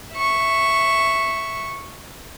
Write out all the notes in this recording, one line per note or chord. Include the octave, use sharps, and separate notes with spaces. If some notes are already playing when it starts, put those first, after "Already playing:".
E5 C#6